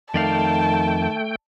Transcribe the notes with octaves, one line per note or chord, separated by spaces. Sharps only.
F2 D#3 A3 D5 F5 G5 A5